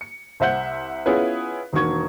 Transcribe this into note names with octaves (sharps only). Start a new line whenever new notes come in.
C#7
C2 C5 E5 F#5 G6
B3 C#4 E4 F4 G#4 B4
E1 D#3 A#3 F#4 C#6 G#6